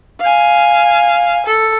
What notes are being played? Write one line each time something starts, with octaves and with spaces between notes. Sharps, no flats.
F5 G#5
A4